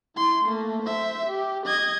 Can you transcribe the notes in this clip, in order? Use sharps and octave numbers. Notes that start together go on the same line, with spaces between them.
E4 C6
A3 A#3
C5 E5
G4
D#5 G#6